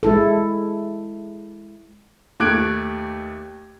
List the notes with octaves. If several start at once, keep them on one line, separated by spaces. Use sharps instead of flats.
G#3 E4 A4
D#2 A3 D6 F#6 G#6 D7